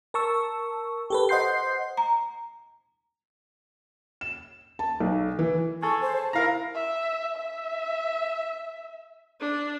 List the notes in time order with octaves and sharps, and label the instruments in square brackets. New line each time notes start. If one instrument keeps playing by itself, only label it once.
[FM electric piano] A#4 A5 C#6 E6
G4 A4 B4
C5 D#5 F#5 C6 G6 C7
[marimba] A#5
[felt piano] E7
A5
B1
E3
[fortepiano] G#4 A4 [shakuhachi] C#6
[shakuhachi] C5
A5
[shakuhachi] E4 [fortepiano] A#4 F5 A#5
[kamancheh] E5
E5
[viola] D4